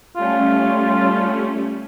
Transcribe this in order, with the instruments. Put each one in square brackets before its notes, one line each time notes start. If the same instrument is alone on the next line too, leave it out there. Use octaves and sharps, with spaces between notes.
[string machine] G3 A3 C#4 [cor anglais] F4